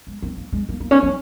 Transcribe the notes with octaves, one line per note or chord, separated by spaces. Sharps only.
G#3
C4
A#3
G#3
A#3
A#3
C#4
C4